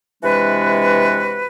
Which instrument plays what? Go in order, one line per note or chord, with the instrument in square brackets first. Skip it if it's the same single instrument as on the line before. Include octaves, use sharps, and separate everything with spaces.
[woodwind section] C3 E3 G#3 D4 F#4 B4